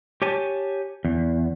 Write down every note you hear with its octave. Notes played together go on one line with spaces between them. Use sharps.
G4 C#5 G#5 A5
E2